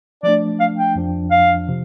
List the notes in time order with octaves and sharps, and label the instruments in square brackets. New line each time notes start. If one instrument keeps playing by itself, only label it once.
[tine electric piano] F3 A3 D4 [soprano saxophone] D5
[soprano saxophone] F5
G5
[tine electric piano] F2 F3 D4
[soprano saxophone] F5
[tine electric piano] C3 F3